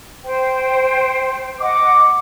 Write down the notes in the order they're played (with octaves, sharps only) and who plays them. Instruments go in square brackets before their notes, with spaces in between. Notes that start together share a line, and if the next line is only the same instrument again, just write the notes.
[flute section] C5 G5
[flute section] D#5 F#5 [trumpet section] D6